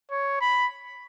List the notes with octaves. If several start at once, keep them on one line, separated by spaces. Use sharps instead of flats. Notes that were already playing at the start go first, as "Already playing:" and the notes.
C#5
B5